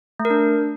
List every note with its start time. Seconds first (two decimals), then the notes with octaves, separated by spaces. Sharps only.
0.20 A3
0.25 A#4
0.30 D4